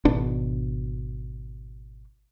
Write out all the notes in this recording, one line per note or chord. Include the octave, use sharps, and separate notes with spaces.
G#1 B2 D4